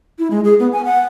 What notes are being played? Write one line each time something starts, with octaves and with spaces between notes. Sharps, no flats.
E4
G#3
G#4
B3
G#5
F#5